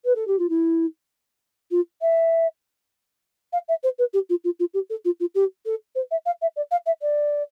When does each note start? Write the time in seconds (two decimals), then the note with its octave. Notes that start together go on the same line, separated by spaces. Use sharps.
0.05 B4
0.15 A4
0.27 G4
0.39 F4
0.49 E4
1.71 F4
2.02 E5
3.53 F5
3.69 E5
3.83 C5
3.99 B4
4.13 G4
4.30 F4
4.44 F4
4.60 F4
4.74 G4
4.90 A4
5.05 F4
5.20 F4
5.35 G4
5.66 A4
5.95 C5
6.11 E5
6.26 F5
6.42 E5
6.56 D5
6.71 F5
6.86 E5
7.02 D5